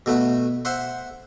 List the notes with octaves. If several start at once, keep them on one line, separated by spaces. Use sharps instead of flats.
B2 A3 B3
C5 E5 F#5 C6